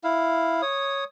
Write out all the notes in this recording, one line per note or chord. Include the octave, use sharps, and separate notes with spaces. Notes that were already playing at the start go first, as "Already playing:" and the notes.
E4 F5
C#5 D#6